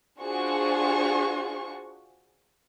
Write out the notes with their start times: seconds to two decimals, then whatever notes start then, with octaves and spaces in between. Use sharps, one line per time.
0.21 D4 F4 F#4 G#4 C5 C#6